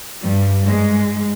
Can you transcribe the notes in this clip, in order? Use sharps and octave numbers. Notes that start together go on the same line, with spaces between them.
G2 G3
G#2 G#3